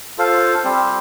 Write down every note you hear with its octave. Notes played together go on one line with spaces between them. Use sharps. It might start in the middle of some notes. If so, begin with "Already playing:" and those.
F4 A4 C5 F5
G3 C4 G4 C5